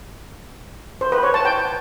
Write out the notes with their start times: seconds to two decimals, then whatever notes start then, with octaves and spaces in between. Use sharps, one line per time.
1.01 C5
1.12 B4
1.23 C#5
1.34 A5
1.45 G5